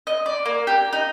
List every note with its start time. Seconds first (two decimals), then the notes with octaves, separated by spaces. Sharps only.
0.07 D#5
0.26 D5
0.45 A#3
0.67 G4
0.93 D#4